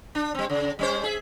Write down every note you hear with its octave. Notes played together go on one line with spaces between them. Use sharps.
D4
G3 C4
C#3
G3 C#4 C5
G#4 E5